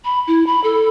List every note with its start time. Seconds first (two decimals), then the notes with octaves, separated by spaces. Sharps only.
0.05 B5
0.27 E4
0.47 B5
0.64 A4